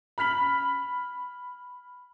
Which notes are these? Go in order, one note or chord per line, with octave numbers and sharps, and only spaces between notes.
B5 F6 B6 F#7